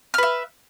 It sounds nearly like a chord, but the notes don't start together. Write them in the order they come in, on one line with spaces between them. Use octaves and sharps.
F6 B4 E5